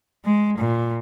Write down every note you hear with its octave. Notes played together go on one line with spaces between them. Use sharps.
G#3
A#2